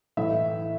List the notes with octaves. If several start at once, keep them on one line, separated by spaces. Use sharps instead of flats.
A2 E3 A3 E4 E5